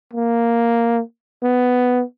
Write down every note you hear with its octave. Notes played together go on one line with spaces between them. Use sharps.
A#3
B3